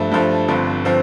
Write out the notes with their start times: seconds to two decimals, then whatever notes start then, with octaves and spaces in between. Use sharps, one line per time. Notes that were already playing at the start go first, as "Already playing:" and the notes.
Already playing: G2 F3 A3
0.11 G2 F3 A3
0.48 G1 G2 F3 C4
0.85 F3 C4